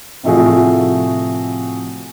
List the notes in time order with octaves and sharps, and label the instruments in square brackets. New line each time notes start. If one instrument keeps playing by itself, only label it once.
[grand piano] A2 C3 F3 A3 F#4 G#4